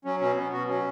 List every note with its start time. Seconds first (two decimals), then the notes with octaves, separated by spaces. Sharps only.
0.05 F#3 C#4
0.20 B2 C#4
0.36 B3 C#4
0.52 B2 F#4
0.68 F#3 C#4